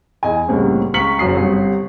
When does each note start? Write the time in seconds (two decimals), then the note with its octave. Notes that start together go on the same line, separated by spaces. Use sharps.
0.23 E2 D#5 G#5
0.48 C2 A2 C#3 A#3 C4
0.94 C#2 A#5 C#6 B6 C#7 F#7
1.19 F#1 F#2 A#5 D#6 C7
1.37 G1 C3